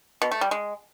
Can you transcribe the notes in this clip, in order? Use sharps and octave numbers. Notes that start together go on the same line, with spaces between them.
B2
A3
G3
G#3